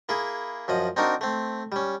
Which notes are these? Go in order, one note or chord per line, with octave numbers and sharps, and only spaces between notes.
A#3 E4 G#4
F#2 F3 D#5
C4 D4 D#4 F#4 A#4
A3 C4
G3 C#4